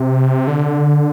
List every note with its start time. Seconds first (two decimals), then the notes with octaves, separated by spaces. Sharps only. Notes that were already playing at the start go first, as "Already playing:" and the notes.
Already playing: C3
0.47 D3